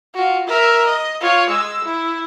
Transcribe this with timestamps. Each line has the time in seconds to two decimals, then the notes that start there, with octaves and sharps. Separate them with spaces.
0.14 F4 F#4
0.47 A#4 E5
0.86 D#5
1.21 F4 C#5
1.50 G#3 E6
1.84 E4